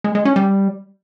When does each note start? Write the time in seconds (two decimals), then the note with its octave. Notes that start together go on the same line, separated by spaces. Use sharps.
0.04 G#3
0.15 G#3
0.25 C#4
0.36 G3